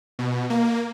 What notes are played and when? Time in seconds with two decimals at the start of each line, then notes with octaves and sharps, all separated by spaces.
0.19 B2
0.50 A#3